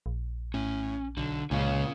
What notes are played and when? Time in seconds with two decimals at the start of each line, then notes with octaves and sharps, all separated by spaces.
0.06 A#1
0.54 A2 C#4
1.17 B1 D3
1.51 C#2 A#2 C#4 F5